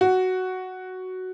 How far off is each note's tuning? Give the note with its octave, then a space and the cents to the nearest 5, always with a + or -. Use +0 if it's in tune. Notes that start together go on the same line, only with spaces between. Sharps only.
F#4 +5